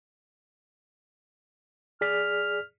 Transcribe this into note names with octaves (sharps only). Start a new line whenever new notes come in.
G#4 D5 F6 B6